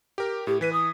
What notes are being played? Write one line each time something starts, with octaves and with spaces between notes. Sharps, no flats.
G4 A#4
A2 G4
E3 B4 B6 D#7
D#6